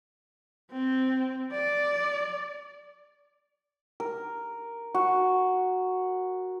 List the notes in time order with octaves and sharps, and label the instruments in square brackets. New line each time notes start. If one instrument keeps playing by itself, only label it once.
[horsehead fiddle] C4
D5
[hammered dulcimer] A#4
F#4